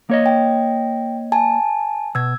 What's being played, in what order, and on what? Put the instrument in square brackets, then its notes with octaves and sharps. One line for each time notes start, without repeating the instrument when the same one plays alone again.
[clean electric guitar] A#3 C#5 D#5
[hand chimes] G5
G#5 A5
[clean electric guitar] B2 [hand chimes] E6 G#6